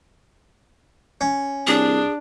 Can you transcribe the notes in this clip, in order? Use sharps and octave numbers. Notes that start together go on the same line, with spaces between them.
C#4
C2 D4 G#4